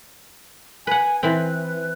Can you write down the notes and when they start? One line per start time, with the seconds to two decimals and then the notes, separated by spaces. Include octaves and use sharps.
0.87 B4 F#5 G#5
1.23 E3 C4 B4